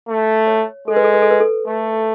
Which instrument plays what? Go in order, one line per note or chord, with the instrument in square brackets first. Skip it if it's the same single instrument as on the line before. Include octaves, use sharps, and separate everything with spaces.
[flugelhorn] A3
[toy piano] C#5
[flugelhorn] G#3 [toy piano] A4
[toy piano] B4
A4
B4
A4
B4
A4
[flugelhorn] A3